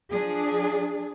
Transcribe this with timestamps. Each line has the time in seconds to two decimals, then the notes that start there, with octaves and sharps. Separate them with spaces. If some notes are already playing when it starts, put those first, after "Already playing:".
0.11 F3 D4 G#4